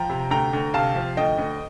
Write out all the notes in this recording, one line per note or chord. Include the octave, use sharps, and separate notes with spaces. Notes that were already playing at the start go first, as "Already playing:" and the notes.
Already playing: F3 G5 A#5
C3
D2 G5 A#5
D2
C3 F5 A5
F3
D2 D#5 G5
D2